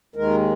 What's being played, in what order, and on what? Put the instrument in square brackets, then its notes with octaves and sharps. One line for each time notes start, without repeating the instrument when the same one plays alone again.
[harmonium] D#2 D#3 G#3 A#4